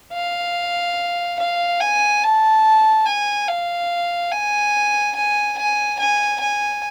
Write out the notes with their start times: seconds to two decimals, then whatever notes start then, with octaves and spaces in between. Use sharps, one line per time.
0.13 F5
1.40 F5
1.81 G#5
2.23 A5
3.06 G#5
3.48 F5
4.32 G#5
5.15 G#5
5.58 G#5
5.99 G#5
6.40 G#5